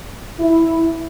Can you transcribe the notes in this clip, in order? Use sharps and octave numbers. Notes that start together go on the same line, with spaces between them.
E4